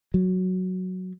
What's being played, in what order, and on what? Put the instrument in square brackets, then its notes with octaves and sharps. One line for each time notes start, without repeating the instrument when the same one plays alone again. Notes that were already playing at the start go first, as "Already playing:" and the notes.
[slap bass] F#3